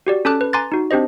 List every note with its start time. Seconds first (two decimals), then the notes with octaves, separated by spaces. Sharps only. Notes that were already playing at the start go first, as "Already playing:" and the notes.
0.07 F#4 G4 D5
0.25 C#4 A4 A5 D6 F#6
0.41 B4
0.53 G#5 A#5 C6 D6 F#6 A6
0.72 D#4 F#4
0.91 C4 D4 G4 C5 D#5